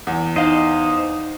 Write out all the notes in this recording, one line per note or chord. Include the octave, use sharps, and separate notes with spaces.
E2
D#4 C5 D#5 F5